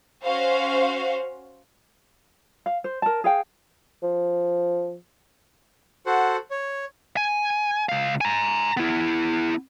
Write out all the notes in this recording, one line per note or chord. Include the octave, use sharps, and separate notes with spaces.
C#4 F#4 C5 F5
F5
C5
A#4 A5
G#4 F5 G5
F3
F#4 A4 C5 F#5
C#5
G#5
C#2 F5
G#5 A#5
B3 E4